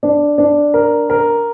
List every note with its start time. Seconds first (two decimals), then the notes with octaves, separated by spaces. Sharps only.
0.03 D4
0.38 D4
0.74 A#4
1.10 A#4